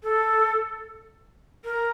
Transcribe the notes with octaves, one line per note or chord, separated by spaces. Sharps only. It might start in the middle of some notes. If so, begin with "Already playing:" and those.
A4
A#4